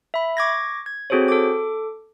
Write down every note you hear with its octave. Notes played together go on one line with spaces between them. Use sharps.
E5 B5
C#6 D6 G#6 A#6
G#6
C4 F#4 G#4 A4 C5 C#5
A4 D6